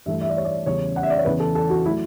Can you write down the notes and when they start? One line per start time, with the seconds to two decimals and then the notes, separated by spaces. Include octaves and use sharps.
0.06 G2 E3 A3 E5
0.21 E5
0.29 D5
0.37 C#5
0.45 D5
0.66 E2 C#3 G3 C#4 C#5
0.96 F#5
1.03 E5
1.10 D5
1.18 C#5
1.25 E2 C#3 E3 B4
1.40 A4
1.55 A4
1.70 F#4
1.85 F#3 A3 E4